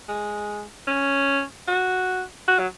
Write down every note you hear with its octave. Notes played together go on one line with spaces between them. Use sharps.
G#3
C#4
F#4
F#4
F#3